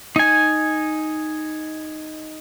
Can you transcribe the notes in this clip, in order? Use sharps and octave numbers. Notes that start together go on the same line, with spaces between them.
D#4 G#5